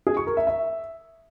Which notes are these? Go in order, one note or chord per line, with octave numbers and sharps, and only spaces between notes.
G#4
C#6
A#4
E5
E5